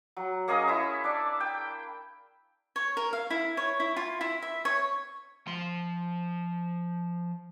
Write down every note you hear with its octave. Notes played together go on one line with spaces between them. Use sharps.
F#3
A#3 C#4 G#4 D#5
E4 E5 C#6
D4 D5
G5
C#5
A#4
F5
E4
C#5
E4
F4
E4
E5
C#5
F3 C6